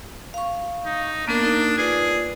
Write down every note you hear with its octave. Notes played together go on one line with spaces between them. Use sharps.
F5 C#6
D#4
A#3 B3 D4 A#4
A#3 D#4 A#4
F4 G#4 B4 D5